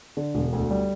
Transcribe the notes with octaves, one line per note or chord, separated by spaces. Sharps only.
D3
E1
D2
G3